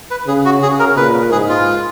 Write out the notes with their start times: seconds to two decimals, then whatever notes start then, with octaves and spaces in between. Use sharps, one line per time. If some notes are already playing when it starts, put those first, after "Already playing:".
0.11 B4
0.27 C#3 G#4
0.45 F#4
0.62 C#3 G#4
0.79 A#4
0.97 A#2 B4
1.31 G#2 G#4
1.49 F4